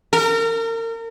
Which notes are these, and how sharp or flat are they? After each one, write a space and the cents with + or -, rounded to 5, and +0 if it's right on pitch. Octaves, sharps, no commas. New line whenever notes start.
A#4 -35